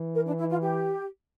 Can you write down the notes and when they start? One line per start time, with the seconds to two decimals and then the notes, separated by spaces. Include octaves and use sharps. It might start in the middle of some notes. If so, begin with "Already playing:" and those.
Already playing: E3
0.15 A#4
0.26 D4
0.38 E4
0.50 F4
0.62 G4